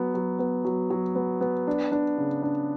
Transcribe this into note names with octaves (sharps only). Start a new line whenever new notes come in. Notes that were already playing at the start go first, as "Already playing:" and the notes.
Already playing: F#3 B3
F#3
B3
F#3
F#3
B3
B3
D4
D4
C#3
D4